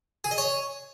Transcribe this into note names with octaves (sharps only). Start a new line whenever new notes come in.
G#4
D#5
C#5